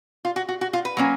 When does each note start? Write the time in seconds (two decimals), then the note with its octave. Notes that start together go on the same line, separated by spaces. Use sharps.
0.25 F4
0.36 F#4
0.49 F#4
0.61 F#4
0.73 F4
0.85 B4
0.97 F#3 A#3 C#4